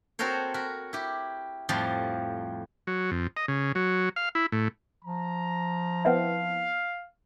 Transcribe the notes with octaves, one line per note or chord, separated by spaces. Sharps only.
C4 F#4 A4 A#4 C5 C#5
F#4 A#4 B5
E4 G4
F2 A2 F3 G3
F#3
F2
D#5
C#3
F#3
F5
E4
A2
F3 A#5
B3 C4 E4 F5